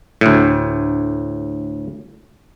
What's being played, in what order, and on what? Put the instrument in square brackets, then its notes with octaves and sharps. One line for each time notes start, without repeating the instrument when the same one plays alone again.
[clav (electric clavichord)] D2 A2